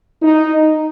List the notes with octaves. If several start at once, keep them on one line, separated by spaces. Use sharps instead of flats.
D#4